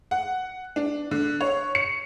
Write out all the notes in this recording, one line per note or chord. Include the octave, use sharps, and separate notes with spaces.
F#5
D4
D3
C#5
C#7